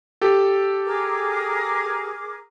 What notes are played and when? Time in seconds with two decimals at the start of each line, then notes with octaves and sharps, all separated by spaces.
0.21 G4 A4
0.85 G#4 A#4 D6